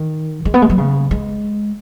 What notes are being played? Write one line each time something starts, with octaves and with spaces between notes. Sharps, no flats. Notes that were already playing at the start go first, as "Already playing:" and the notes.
Already playing: D#3
G#3
B3
G#3
F#3
C#3
G#3